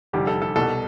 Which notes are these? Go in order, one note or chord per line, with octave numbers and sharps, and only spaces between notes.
F1 E2 D3 G3 G4
A4
A4
C2 B2 G3 A4